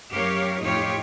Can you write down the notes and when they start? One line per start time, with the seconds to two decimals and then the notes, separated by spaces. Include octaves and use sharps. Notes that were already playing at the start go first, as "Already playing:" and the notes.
0.11 F#2 G4 A#4 C#5 F5
0.61 F2 A2 D#4 F4 G4 C#5